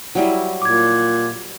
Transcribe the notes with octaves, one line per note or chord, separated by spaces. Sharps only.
F#3 G3 E4
A#2 D6 G#6